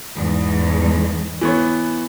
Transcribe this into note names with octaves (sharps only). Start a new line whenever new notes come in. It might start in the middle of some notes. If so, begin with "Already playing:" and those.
E2 G#2
E3 B3 C#5